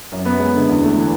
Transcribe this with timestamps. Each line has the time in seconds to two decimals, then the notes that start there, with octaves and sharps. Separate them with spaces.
0.12 F#2
0.26 B3
0.40 G#3
0.54 D3
0.69 E2
0.83 A3
0.97 E3